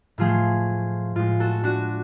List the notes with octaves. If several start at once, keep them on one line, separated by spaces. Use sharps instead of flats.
A2 F3 A3 F4 G#4
A2 G#3 F4
F#4 A4
D4 F#4